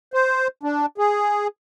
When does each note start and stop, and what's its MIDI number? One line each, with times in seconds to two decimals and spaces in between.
0.14 0.48 72
0.63 0.86 62
0.98 1.47 68